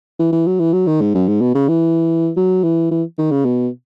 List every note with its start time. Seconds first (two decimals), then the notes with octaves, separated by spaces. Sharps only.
0.20 E3
0.33 E3
0.47 F#3
0.60 E3
0.73 F#3
0.87 D#3
1.01 G#2
1.15 F#2
1.28 G#2
1.41 B2
1.55 C#3
1.68 E3
2.37 F#3
2.64 E3
2.91 E3
3.18 D#3
3.31 C#3
3.45 B2